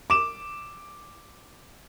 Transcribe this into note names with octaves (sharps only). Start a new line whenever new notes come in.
D6 E7